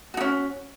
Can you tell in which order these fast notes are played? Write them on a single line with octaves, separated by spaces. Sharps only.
F#4 D#4 C#4